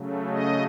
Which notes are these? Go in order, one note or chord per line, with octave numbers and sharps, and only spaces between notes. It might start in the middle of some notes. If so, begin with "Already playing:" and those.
Already playing: C#3 F#3 A3
D#5